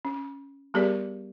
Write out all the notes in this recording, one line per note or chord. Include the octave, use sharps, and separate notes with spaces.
C#4
G3 B3 G4 G#4 A#4 D5